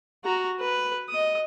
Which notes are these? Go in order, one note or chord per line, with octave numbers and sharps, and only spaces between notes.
F#4 A#5
B4
D#5 D#6